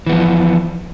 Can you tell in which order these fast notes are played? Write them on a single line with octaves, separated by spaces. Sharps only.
E3 B3 F3